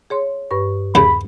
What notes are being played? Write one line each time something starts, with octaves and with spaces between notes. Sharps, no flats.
G#4 C#5 C6
G2 B4 C#6
D#2 C#3 B5